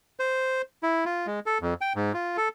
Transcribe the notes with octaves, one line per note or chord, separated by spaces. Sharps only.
C5
E4
F4
G#3
A4
F2
G5
G#2
F4
A4